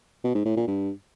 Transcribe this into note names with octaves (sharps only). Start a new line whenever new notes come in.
B2
G#2
A2
A#2
G2